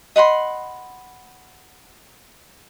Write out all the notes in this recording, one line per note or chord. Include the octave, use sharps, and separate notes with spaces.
D#5 F#5 B5 C6